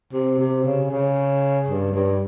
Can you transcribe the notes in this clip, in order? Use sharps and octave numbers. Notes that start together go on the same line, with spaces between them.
C3
C3
C#3
C#3
G2
G2